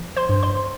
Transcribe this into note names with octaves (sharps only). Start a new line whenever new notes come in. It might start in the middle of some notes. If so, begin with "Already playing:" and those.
Already playing: F3
C5 C6
G2
C5 C6